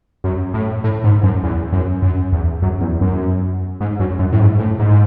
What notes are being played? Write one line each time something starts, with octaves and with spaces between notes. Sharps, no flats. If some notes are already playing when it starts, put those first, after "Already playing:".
F#2
A2
A2
G#2
F#2
E2
F#2
F#2
E2
F#2
E2
F#2
G#2
F#2
F#2
A2
G#2
A2
G#2